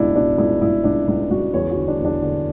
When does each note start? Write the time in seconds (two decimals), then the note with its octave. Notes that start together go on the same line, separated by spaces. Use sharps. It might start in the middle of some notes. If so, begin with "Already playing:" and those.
Already playing: C#2 B2 D4 E4
0.15 B2 D4
0.38 C#2 E4
0.62 C#2 E4
0.84 C#2 D4
1.08 C#2 E4
1.30 C#2 F#4
1.54 E2 C#5
1.71 F#4
1.77 D3
1.88 D4
2.00 E2 D4
2.22 D3